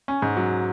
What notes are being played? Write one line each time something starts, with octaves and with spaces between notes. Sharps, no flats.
C#4
G#2
F#3